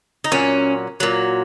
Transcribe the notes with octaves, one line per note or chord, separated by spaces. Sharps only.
D#4
A#2 F#3 C#4
A#2 F#3